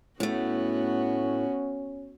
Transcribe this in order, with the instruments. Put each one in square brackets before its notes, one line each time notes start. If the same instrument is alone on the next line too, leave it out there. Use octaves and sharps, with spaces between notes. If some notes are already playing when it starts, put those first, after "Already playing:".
[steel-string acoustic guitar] A2 A3 [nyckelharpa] B3 F#4 [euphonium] C#4